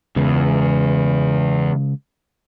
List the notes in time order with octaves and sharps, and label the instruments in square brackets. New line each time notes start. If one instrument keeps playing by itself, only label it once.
[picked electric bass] E2 [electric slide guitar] C#3 G#3